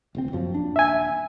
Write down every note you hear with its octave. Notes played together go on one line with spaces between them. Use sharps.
D1 C#2 C4
F#1 F#2 F3
D#1 D4
E5 G#5